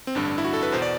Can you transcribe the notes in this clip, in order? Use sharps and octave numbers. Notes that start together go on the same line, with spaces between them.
C4
A1 G2 D3 D4
E4
F#4
A4
B4
E2 B2 C5
D5